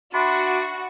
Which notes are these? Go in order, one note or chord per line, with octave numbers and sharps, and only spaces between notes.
D4 F#4 E5 B5 C6